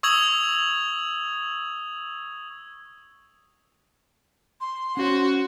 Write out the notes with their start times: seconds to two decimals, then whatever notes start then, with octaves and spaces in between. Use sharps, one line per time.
0.03 C#6 D#6 E6 G#6 F7 F#7
4.61 C6
4.97 C#4 F#4 C5 C#5